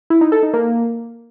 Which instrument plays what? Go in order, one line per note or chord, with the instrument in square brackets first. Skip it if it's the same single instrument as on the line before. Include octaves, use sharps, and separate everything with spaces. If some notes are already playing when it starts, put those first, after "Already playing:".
[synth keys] E4
D#4
A4
D#4
A#3